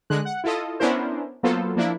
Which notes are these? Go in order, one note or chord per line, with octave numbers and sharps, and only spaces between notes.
D3 G#3 F#6
F#5
E4 F4 A4 D#5
B3 C#4 D4 E4 A#4 C5
F#3 A#3 B3 F4 A4 C5
F3 A#3 D4 E4